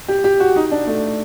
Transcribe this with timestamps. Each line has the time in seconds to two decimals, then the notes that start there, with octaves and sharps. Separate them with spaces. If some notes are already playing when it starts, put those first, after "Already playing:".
0.08 G4
0.24 G4
0.40 F#4
0.56 D#4
0.71 D4
0.87 A3